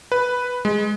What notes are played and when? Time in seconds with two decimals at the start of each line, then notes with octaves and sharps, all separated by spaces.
0.12 B4
0.65 G#3